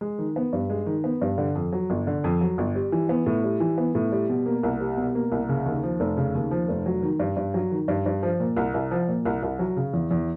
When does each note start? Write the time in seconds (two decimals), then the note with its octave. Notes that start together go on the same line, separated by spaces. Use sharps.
0.01 G#3
0.19 D#3
0.36 B3
0.53 G2
0.70 G#3
0.86 D#3
1.04 B3
1.22 G2
1.38 D3
1.55 F2
1.72 F#3
1.90 G1
2.07 D3
2.24 F2
2.41 F#3
2.58 G1
2.75 G3
2.92 E3
3.09 B3
3.26 A2
3.44 G3
3.60 E3
3.78 B3
3.95 A2
4.12 G3
4.29 B2
4.46 A#3
4.63 C2
4.80 G3
4.97 B2
5.15 A#3
5.32 C2
5.49 C#3
5.66 D#2
5.83 F3
6.00 F1
6.17 C#3
6.35 D#2
6.51 F3
6.68 F1
6.86 F#3
7.03 D#3
7.20 G2
7.37 G2
7.54 F#3
7.71 D#3
7.88 G2
8.06 G2
8.23 F3
8.40 A#2
8.57 C2
8.74 C2
8.91 F3
9.08 A#2
9.25 C2
9.43 C2
9.59 F#3
9.77 C#3
9.93 E2
10.11 E2